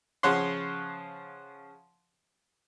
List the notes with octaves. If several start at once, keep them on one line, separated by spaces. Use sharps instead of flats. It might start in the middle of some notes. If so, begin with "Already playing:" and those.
C#3 F3 C#5 F#5 C6